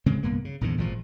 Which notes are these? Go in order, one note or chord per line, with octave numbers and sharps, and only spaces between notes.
C#3 G#3 C4
C2 G2 A#3 B3
C#3
A#1 E2 G#2 D3
G#1 A#2 D3 F3